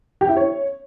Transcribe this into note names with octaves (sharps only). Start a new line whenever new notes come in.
G4
E4
C#5